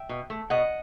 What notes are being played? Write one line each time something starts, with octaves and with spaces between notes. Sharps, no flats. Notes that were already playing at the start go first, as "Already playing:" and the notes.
Already playing: E5 G5
B2
A3
B2 D#5 F#5